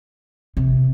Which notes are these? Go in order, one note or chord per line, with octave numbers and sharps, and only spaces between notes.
C3